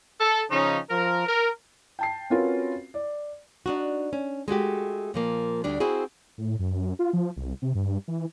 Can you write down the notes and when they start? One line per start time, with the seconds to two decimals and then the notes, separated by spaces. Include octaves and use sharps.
0.21 A4
0.51 C#3 F3 C#4 D#4
0.90 F3 A#4
1.28 A#4
1.99 G5 A5 C7
2.30 C4 C#4 F4 F#4 A#4 B4
2.94 D5
3.66 D4 D#4 F#4
4.13 C#4
4.48 G#3 A3 F#4 G4
5.14 A#2 F3 A#3
5.64 D2 G3 D4
5.80 C4 E4 F#4 G#4
6.38 A2
6.59 F#2
6.99 F4
7.13 F3
7.37 C2
7.62 C3
7.75 G2
8.08 E3